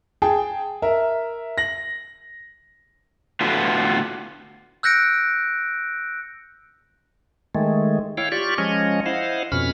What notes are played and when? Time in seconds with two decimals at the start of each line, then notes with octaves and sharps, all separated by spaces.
0.22 G#4 G5 A5
0.82 A#4 E5
1.58 A#6 F#7
3.41 A2 D3 B3 F4 F#4 B4
4.83 E6 F#6 G6 A#6 C#7 D7
7.55 D#3 G#3 A3
8.17 E4 C#5 F5 G5
8.32 F4 G4 D5 C#6
8.58 F3 G#3 C#4 C#5 D#5
9.06 E4 C5 D#5 F5 F#5
9.52 F2 B2 C#4 B5 F6